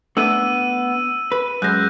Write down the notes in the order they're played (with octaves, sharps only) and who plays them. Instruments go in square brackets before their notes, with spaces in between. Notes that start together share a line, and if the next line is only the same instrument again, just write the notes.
[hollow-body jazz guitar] A3 B3 D4 [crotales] E6 D#7
[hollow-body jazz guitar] B4
[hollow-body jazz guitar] F#2 G#3 [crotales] F#6 G6 A#6